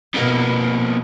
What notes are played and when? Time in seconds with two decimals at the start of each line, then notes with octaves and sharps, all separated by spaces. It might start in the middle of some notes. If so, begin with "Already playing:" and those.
0.14 F2 B2 A#3 B3